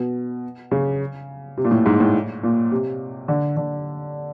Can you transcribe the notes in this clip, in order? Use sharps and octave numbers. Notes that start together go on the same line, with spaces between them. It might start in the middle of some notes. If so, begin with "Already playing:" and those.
Already playing: B2
C#3
C3
A#2
A2
G#2
A2
A#2
C3
D3
D3